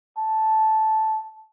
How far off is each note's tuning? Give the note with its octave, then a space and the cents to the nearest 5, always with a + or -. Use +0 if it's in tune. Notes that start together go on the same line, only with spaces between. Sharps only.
A5 -10